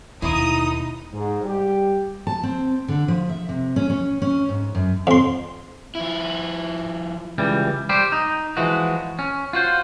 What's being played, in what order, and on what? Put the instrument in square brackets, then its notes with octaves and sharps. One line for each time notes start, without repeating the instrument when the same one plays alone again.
[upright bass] D#2 B2 [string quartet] D#4 [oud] E4 [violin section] D#6
[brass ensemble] G#2
G3 G4
[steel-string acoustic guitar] A5
C4
D3
F3
E5
C3
C#4
C#4
C#4
G#2
F#2
[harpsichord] F2 C6
[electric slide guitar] F3 E4
[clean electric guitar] C#2 E3 G3
G3 G4 C5
D#4
E3 F3 G#3 F#4
C#4
F4 F#4 C5